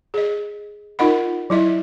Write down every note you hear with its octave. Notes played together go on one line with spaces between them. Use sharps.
G#4 D#5
D#4 F4 A#4 D#5 F#5 B5
F#3 E4 D#5 E5